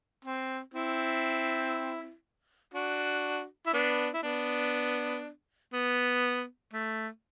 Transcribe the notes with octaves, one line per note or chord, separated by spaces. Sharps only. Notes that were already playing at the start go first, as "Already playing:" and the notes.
C4
C4 E4
D4 F#4
E4
B3 D4
E4
B3 D4
B3
A3